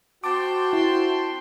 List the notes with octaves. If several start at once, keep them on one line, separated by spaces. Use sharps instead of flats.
C4 F#4 G5 A5 C6 D6
E4